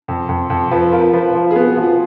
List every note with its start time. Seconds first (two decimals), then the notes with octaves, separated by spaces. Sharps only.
0.08 F2
0.29 F2
0.50 F2
0.71 F3 B4
0.92 F4 A#4
1.13 F3 B4
1.35 F3
1.51 G#4
1.56 B3
1.66 F#4
1.77 F3
1.82 F4